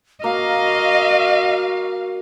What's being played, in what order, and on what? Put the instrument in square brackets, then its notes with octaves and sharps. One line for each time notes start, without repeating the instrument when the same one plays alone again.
[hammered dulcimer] A#3 [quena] F#4 [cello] D#5 [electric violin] F5